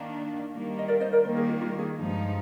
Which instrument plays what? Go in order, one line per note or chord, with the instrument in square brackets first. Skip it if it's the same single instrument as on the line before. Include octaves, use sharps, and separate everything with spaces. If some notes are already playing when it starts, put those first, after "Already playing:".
Already playing: [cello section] D#3 A#3 D4
D#3 G3 A#3
[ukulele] D#5
A#4 D5
C5 D#5
A#4 D5
[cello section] D#3 G3 A#3 [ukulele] C5
[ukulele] G#4
F4
F4
G#4
[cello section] G2 F3 G#3 D#4